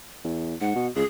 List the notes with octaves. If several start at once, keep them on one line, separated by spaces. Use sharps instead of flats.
E2
G#2 F#5
B2
C#2 G#4